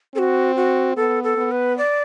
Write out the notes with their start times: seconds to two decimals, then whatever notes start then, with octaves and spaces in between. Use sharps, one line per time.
0.15 C4 A4
0.19 F#4
0.56 F#4
0.96 B3 A4
1.24 A4
1.37 B3
1.51 B4
1.78 D5